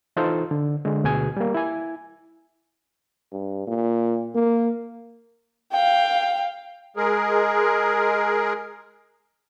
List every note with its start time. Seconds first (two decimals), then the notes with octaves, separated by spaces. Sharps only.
0.16 E3 D#4 F4 A4 C5
0.51 D3
0.85 D3 G#3
1.04 D2 B2 G#4 G#5
1.37 G3 A#3
1.54 E4 G#5
3.32 G2
3.67 A#2
4.35 A#3
5.73 F5 G5
6.97 G#3 G#4 A#4